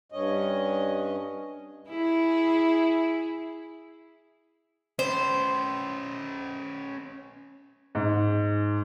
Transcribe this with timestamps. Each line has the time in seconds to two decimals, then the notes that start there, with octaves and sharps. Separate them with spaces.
0.12 G2 C#4 D#5
1.90 E4 G#4
4.99 C#4 B4 C5
7.95 G#2